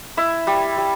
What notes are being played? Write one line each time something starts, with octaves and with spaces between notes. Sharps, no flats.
E4 E5
G3
G3